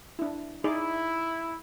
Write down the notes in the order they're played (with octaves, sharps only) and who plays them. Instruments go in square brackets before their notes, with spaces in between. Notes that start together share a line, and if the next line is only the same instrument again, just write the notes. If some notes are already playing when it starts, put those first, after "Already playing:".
[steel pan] D4 E4
[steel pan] D#4 G#4 D5 [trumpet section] E4